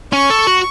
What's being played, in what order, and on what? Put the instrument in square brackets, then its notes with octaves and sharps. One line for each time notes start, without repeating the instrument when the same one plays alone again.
[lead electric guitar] C#4 [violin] C#6
[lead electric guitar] A4
F#4